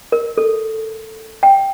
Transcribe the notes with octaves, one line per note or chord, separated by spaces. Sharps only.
A#4
A4
G5